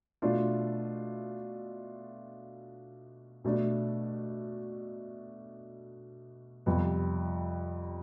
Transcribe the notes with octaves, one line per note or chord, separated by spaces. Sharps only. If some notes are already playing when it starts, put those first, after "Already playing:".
B2 A3 D4 F4
B2 A3 D4
F2 C3 G3 B3